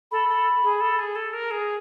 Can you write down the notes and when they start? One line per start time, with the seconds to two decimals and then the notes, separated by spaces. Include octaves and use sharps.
0.11 A4 B5
0.29 A4
0.63 G#4
0.81 A4
0.99 G#4
1.15 A4
1.33 A#4
1.51 G#4